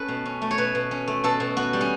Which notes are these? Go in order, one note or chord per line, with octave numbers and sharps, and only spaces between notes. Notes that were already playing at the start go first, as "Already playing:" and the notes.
Already playing: A3 C#4 A4 B4
B2
C#4
A3
C#5
B2 B4
B2
C#4
A3
B2 A4
B2
B3 F#4
G3
C#4